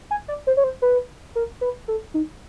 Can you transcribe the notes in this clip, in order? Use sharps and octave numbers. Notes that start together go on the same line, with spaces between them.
G#5
D5
C5
C#5
C5
B4
A#4
B4
A4
D#4